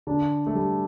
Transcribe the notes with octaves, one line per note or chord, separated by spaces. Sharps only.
D3 D4
A3
G3